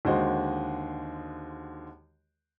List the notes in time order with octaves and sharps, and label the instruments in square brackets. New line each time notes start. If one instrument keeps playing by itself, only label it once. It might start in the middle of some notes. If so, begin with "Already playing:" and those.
[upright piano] D#2 D3 G#3 F#4 C5 D#5